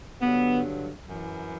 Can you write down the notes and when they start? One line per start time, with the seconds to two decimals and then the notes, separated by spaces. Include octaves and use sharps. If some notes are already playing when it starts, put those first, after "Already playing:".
0.20 G2 D3 F#3 B3
1.07 F#2 E3